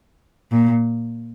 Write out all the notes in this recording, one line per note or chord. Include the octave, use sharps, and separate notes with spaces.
A#2